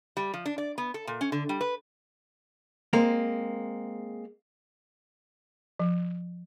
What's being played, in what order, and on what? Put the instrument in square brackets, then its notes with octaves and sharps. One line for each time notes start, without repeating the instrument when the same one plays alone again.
[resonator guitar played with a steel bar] G3
F3
D4
D5
B3
A4
A#2
C#4
D3
G3
B4
[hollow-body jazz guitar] G#3 A#3 C4
[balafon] F3